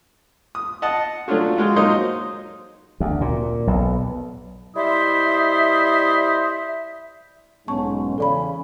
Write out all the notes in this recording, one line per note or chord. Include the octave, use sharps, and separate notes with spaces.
D#6
D#5 F#5 A5
F#3 A3 C#4 D4 F4 F#4
G#3 F4 F#4
F#3 A#3 D#4 C5 C#5 D#5
D2
A#2
B1
G3 E4 C5 D#5 E5
B1 G#2 B3 C#4 A5 C#6
E2 C#3 A4 D5 B5